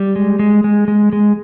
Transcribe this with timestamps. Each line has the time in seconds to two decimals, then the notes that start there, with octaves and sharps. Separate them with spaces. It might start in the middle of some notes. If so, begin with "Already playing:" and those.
Already playing: G3
0.16 G#3
0.39 G#3
0.64 G#3
0.88 G#3
1.13 G#3